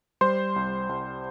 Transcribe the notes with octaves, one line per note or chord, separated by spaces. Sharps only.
G3 C5 C6
C2
C2